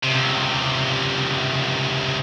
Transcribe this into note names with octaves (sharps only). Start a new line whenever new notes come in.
C#2 C3